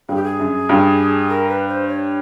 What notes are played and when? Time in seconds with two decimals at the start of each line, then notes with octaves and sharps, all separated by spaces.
0.09 G2 G#4
0.15 G4
0.24 G#4
0.39 F#2
0.69 G2
1.29 A#4
1.49 B4
1.68 C5
1.88 C#5